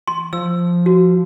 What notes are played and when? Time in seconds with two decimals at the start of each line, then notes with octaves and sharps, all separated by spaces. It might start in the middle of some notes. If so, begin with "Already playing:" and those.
0.08 C6
0.33 F3 E6
0.86 F#4